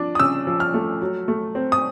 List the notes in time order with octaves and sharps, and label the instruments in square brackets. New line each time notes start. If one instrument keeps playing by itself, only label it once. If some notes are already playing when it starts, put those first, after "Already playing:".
Already playing: [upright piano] F3 D4
D#6
C#3 E6
F3
F6
A3
F#3
A3
C4
D#6